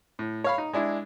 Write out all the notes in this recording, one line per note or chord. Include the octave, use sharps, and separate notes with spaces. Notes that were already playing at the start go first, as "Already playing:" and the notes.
A2
C#5 F5 B5
D#4
G#3 D4 E4